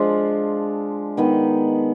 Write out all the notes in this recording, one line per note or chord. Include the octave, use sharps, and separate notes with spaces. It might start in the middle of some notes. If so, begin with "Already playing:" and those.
Already playing: F3 G#3 D4 F4
D#3 G#3 B3 D#4